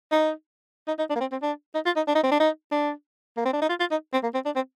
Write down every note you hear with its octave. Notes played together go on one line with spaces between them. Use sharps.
D#4
D#4
D#4
D4
A#3
C4
C4
D4
D#4
F4
D#4
D4
D#4
C4
D4
D#4
D4
A#3
C4
D4
D#4
F4
F4
D#4
C4
A#3
C4
D4
C4